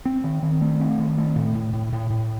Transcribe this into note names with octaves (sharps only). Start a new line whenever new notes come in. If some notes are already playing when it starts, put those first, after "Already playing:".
C4
D#3
D#3
A3
C4
D#3
A3
A2
A2
A2
A2
A2